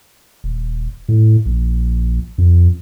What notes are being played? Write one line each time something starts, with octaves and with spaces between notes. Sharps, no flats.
D#1
A2
A#1
F2